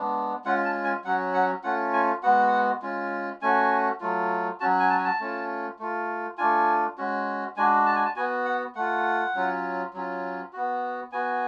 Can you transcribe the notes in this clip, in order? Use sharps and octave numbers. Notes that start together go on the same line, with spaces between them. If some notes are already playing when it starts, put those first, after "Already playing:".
Already playing: G#3 B3 D4
G#3 C#4 F4 F#5
A5
G#5
F#3 C#4 F#4 F#5
F#5
A3 C#4 F4 F#5
G#5
G#3 B3 F#4 F#5
G#3 C#4 F4
A3 C#4 F#4 G#5
F#3 A3 F4
F#3 C#4 F#4 A5
G#5
A5
G#5
A5
A3 C#4 F4
A3 F4
A3 D4 F4 G#5
G#3 C#4 F#4
G#3 D4 F#4 G#5
A5
G#5
A5
B3 F#4 G#5
F#5
A3 F4 F#5
F#3 C#4 F4
F#3 C#4 F4
B3 F#4
B3 F#4 G#5